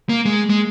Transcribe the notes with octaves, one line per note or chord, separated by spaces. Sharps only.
A#3
G#3
G#3